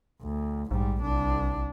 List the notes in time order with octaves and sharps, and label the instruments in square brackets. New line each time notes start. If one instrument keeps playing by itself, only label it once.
[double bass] D2
[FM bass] A#1 [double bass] G#2 G3
[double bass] C2 D4